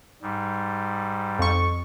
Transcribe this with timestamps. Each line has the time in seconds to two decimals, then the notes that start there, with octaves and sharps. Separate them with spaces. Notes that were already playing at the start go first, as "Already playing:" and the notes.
0.22 G#2 G3
1.39 F2 C#6